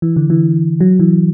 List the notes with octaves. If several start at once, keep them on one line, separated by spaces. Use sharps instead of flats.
E3
D3
E3
F#3
E3